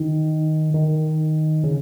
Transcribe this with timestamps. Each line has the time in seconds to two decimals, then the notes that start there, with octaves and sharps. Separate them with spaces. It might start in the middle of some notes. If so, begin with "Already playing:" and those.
Already playing: D#3
0.74 D#3
1.64 C#3